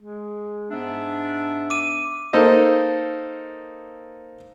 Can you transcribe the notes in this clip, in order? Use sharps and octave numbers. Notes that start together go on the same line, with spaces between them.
G#3
G#2 B3 D4 E5
D6 D#7
A#3 D#4 A4 C5 D#5